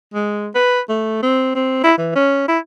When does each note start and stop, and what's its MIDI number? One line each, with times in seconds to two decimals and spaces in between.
0.14 0.48 56
0.55 0.80 71
0.89 1.19 57
1.23 1.53 60
1.55 1.81 60
1.83 1.95 64
1.98 2.13 52
2.15 2.46 61
2.48 2.58 64